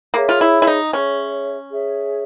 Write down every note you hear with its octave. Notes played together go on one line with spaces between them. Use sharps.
A#3 G#4 C#5 E5
F4
E4
E4
D#4
C#4 G#4 C#5 E5
G#4 C#5 E5